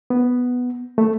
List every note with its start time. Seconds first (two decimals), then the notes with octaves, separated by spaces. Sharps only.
0.10 B3
0.98 A3